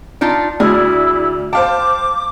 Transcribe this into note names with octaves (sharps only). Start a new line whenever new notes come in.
D4 D#4 F4
D2 E4 G#4 D5 F6
C5 F5 G5 A5 D6